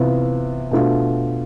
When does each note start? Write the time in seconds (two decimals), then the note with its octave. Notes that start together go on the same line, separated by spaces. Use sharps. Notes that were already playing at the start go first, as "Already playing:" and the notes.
Already playing: C3 E3 B3 F4
0.71 B2 A3 D4 F4